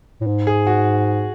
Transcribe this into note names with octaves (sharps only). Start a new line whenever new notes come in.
A2
G#2
G#4
F#4